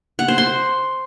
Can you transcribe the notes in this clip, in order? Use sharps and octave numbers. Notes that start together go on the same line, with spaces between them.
F#5
C5
C6